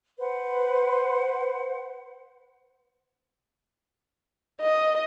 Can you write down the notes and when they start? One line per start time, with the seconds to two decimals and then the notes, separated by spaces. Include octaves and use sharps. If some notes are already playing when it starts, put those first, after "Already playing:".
0.18 B4 C5 F#5
4.61 D#5